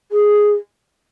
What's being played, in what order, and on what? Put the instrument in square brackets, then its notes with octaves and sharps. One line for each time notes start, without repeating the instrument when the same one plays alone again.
[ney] G#4